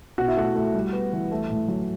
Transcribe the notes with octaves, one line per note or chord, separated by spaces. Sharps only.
B2 F#4
E4
A3 F#4
A3
G3
B3
E3
A3
A2
F#3